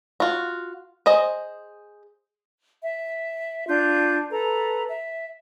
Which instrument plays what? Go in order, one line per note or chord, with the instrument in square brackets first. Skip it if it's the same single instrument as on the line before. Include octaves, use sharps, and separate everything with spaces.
[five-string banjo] F4 F#4
G#4 C5 D#5
[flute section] E5
D4 F4 G6
A4 B4 A#5
E5